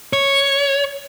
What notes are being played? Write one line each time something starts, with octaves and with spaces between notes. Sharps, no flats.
C#5